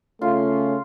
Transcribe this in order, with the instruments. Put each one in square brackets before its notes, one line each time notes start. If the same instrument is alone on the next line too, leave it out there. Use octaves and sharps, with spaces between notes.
[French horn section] C#3 C#4 [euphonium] A3 [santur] F4